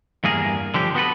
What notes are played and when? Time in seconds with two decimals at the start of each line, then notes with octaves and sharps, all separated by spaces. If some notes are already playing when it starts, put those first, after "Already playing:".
0.24 E2 G2 A#3 G#4 A#4
0.74 D3 F3 G4
0.95 B3 F#4 A4 B4